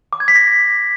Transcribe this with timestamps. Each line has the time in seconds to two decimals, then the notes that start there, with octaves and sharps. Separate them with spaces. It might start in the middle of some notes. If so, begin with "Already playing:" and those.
0.13 D6
0.20 G#6
0.28 B6
0.36 A#6